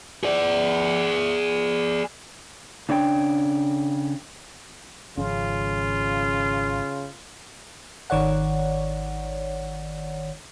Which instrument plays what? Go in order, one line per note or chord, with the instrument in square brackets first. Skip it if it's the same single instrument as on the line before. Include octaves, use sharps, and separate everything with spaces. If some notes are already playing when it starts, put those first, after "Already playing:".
[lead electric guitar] G#4 D5
[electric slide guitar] C#3 D4 C#5 G5
[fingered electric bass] G#1 F3 C#4 [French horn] C#3 [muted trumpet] F4
[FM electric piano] G#1 D#3 C#5 D5 F#5